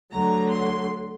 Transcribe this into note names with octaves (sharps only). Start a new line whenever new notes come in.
D2 D3 F#3 A#5
C6